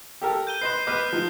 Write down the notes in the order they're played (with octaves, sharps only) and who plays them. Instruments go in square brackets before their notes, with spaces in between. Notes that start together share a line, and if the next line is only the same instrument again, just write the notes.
[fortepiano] G4 A4 A#4
[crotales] G6 D#7 G7
[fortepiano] B4 D#5 C6 [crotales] C7 E7
[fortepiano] B3 B4 D#5 [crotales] D6 F6
[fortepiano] F3 D#4